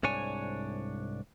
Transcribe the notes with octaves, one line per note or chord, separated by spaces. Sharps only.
C2 G#2 D4 C#5 G#5